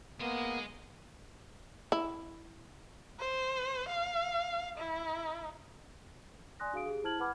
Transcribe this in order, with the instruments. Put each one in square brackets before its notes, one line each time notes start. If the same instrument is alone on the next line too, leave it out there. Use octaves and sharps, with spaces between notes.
[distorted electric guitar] G#3 D#5 [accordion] A#3 B3
[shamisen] E4
[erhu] C5
F5
E4
[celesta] D5 G#5 C6 D#6 F#6 A#6
D4 F#4 G#4 F5 D#6 D7
G4 G#4
E4 C5 A5 F6 G#6 F#7
B4 F#5 B5 D6 F6 G#6